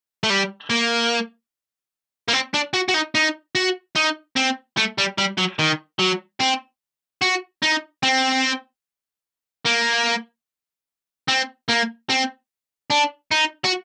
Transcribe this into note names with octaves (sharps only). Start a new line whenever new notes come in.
A3
G3
A#3
A#3
C4
D4
F#4
F#4
D#4
D#4
F#4
D#4
C4
A3
G3
G3
F#3
D#3
F#3
C4
F#4
D#4
C4
A#3
C4
A#3
C4
D4
D#4
F#4